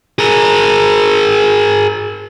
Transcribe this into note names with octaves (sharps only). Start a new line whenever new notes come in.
G#4 A#4